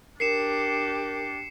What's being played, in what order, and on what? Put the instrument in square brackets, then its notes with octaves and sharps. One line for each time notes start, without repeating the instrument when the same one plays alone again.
[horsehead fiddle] D4 G4 [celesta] A#4 [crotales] C7 C#7 E7